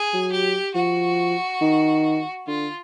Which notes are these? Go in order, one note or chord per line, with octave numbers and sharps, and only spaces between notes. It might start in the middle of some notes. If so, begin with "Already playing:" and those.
Already playing: G#4
F#3
G4
F3 F#4
D#3
D3 F4